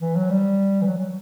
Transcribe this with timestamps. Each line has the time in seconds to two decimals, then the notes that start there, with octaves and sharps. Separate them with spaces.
0.01 E3
0.16 F#3
0.30 G3
0.82 E3
0.86 F#3
0.98 F#3